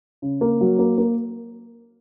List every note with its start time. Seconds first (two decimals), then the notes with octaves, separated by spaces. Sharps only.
0.22 C#3
0.41 A#3
0.61 F#3
0.79 A#3
0.98 A#3